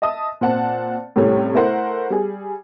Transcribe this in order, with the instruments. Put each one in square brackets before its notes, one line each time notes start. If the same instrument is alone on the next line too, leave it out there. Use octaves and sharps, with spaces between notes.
[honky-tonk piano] D#5 E5 A5 D#6
A#2 C4 F#5 A5
A2 C3 G3 A3 C#4
A3 E4 A#4 C5 F#5
G3 G#4